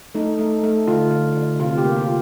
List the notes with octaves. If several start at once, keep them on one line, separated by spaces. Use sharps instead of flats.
A3 D#4
A3
A3
D3 F4
D3
D3
C3 F4
G4
A#3
F4